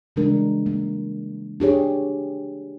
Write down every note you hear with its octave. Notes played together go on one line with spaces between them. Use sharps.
C#3 E3 G3 G#3 D4 A#4
A#3
D4 G4 G#4 C#5